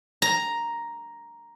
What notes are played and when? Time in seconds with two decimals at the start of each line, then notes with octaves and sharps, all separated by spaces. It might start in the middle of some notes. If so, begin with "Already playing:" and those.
0.22 A#5